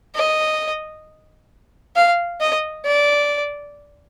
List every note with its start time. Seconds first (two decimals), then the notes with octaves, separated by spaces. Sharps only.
0.15 D#5
1.96 F5
2.41 D#5
2.86 D5